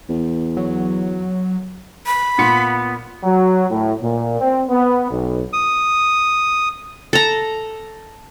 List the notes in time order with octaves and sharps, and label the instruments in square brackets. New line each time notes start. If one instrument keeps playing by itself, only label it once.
[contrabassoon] E2
[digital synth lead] F#3
[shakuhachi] B5
[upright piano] A#2 C6 C#7 [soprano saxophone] B3
[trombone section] F#3
A2
A#2
C4
B3
B1
[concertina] D#6
[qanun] A4 A#5